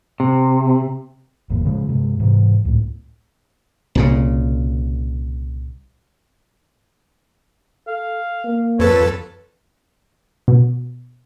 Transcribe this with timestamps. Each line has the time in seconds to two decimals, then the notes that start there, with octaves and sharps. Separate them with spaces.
0.20 C3
1.50 G1 E2 A#2
1.65 C#3 F3 G#3
1.88 G2 C3 G#3
2.20 G#2 C3 E3
2.65 C#2 A2
3.95 C2 A#2 C#3
7.88 A4 F5
8.45 A#3
8.79 F2 A4 B4 C#5
10.48 B2